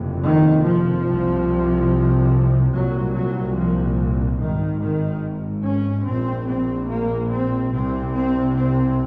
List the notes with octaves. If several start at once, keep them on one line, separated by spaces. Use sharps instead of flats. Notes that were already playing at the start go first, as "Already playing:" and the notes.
Already playing: F#1 F2 C3
D#3
F3
C2 C3
C2 A#2 F#3
F#3
F3
G#1 G#2 D#3
D#3
C#4
A#1 A#2 C4
C4
A#3
C4
C2 C3 C4
C4
C4